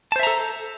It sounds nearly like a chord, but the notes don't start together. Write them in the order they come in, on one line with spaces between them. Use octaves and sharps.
A5 C5 E5 A#5 A4